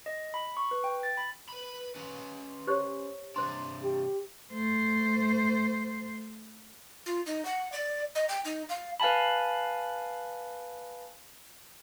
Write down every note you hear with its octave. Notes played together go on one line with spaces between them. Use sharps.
D#5
B5
C#6
B4
G5
A6
B5
B4 B5
C#4 B4
G4 C5 C#5
C3 D4 C5 C6
G4
A3 C5
F4
D#4
F#5
D5
D#5
G5
D#4
F5
B4 F5 G#5 A5 B5